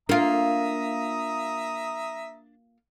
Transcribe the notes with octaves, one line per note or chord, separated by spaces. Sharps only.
A#3 D4 F4 E5 A#5 D#6